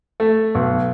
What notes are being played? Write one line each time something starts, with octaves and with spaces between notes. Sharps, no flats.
A3
B1